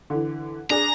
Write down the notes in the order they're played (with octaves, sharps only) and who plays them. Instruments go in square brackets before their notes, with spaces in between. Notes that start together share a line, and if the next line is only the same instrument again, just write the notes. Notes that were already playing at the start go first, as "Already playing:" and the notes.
[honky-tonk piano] D3 E3
[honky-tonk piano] D4 G#4 [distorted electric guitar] A#5